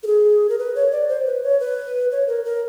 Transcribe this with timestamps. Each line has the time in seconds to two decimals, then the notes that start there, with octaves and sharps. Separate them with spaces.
0.03 A4
0.07 G#4
0.49 A#4
0.59 B4
0.75 C#5
0.92 D5
1.09 C5
1.26 B4
1.43 C#5
1.60 B4
2.11 C#5
2.28 A#4
2.45 A#4